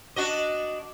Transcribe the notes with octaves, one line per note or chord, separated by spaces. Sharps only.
D4 F#4 D#5